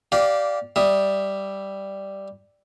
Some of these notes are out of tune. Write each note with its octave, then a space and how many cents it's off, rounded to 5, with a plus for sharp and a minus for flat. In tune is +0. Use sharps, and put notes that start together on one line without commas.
G4 -20 D5 +0 F5 +0
G3 +0 E5 +0 D#6 +0